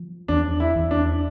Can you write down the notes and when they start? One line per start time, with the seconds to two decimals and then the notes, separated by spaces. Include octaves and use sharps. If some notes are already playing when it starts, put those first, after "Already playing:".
Already playing: F3
0.28 E2 D4
0.60 E4
0.75 E2
0.91 D4